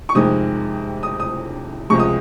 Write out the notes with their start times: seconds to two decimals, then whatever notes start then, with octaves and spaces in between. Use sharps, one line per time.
0.09 C#6
0.15 F2 C3 D#3 G#3 D#6
1.03 D#6
1.20 D#6
1.90 C#2 C3 F3 G#3 C#6
1.99 D#6